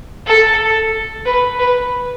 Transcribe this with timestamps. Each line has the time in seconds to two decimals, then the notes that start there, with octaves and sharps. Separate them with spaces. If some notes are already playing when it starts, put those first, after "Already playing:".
0.26 A4
1.25 B4
1.59 B4